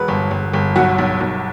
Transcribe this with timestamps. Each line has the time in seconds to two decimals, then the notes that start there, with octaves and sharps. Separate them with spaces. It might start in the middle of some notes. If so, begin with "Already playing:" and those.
Already playing: E1 B4
0.08 G1
0.31 G1
0.53 G1
0.76 B1 F#4
0.98 B1
1.21 B1